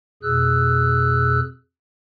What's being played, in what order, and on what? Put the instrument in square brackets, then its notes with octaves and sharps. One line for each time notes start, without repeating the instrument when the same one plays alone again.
[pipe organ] F2 B2 G#4 E6 F#6